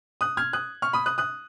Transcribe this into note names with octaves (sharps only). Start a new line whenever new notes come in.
D#6 F#6
F6 G#6
D#6 F#6
C#6 F6
B5 D#6
D#6 F#6
D#6 F#6